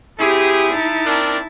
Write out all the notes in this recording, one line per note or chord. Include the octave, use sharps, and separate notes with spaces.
C4 E4 G4 G#4
D#4 A5
C4 D4 A#4